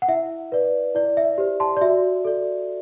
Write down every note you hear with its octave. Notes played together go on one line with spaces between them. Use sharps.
F#5
E4 E5
B4 D5
E4 D5
E5
G4 C5
A5 C6
D5
F#4 E5
A4 D5